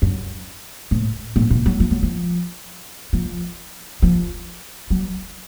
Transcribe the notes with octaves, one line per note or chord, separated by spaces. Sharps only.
F#2
A2
A2
A#2
F#3
F3
F#3
F3
F3
F3
F#3